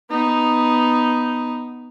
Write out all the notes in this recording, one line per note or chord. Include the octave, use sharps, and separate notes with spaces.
B3 D#4